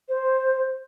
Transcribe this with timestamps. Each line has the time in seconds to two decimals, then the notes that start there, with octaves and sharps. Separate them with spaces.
0.09 C5